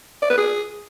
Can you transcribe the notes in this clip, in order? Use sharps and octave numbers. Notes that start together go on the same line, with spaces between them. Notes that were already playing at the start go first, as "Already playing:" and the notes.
D5
B4
G#4